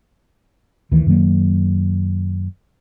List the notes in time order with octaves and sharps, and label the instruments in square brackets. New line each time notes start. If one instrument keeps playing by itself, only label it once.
[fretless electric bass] D2 D#3 E3
F#2 D#3 F#3 A#3